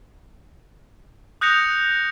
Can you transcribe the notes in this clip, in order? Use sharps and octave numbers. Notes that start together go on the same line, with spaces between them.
D#6 F#6 G6 A#6 C#7 F7